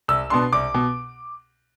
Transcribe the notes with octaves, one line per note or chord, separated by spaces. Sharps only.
C2 E6
B2 B3 D4 C6
C2 D6
B2